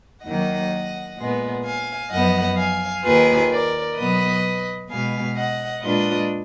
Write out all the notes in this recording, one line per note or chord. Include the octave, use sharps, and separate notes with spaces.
D#2 D#3 F#3 A#3 D#5 F#5
A#2 G#3 B3
F5 G#5
F#2 F3 B3 D#5 F#5
F5 G#5
D#2 D#3 A#3 F4 G#4 B4
A#4 D5
B2 F#3 B3 B4 D#5
B2 G#3 B3 F5 G#5
D#5 F#5
A#2 G#3 D4 F4 B4 D#5